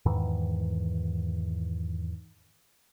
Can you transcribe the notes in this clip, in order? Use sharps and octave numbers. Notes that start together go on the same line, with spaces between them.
E2 G#2 D#3 E3